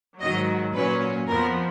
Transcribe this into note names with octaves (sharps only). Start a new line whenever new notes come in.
G#2 D#3 F#3 D#5
A#2 F#3 C#4 B4
F2 F3 B3 A#4